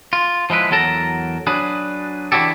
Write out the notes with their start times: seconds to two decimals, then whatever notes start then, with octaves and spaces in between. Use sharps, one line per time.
0.13 F4
0.50 F3 G#3 E4 B4
0.71 E2 F#3 A4 A#4 A5 A#5
1.47 F#3 D4 G#4 B4
2.32 E3 D4 E4 F#4 G4 A4